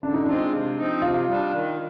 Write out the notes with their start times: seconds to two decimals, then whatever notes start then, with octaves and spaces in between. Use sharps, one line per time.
0.03 D3 D4
0.14 D#4
0.25 G#3 C4 D4 F4
0.53 C3
0.78 F3 C4 D#4
1.02 C3 F4
1.27 G3 D4
1.52 D#3